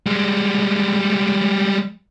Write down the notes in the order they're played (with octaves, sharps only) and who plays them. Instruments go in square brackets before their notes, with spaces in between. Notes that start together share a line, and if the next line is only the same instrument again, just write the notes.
[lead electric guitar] G3 G#3